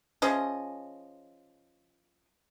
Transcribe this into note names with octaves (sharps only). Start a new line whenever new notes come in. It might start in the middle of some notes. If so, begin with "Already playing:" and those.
F3 C#4 G#4 D#5